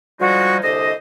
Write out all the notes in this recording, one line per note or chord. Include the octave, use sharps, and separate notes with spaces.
D3 F3 G3 G#3 D#4 F#4
C2 D3 C5 D#5